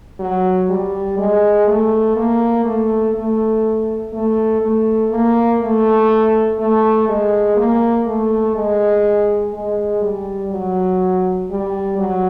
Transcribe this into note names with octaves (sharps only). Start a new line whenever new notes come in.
F#3
G3
G#3
A3
A#3
A3
A3
A3
A3
A#3
A3
A3
G#3
A#3
A3
G#3
G#3
G3
F#3
G3
F#3